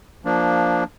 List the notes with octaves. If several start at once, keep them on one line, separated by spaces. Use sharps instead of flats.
F3 A#3 D4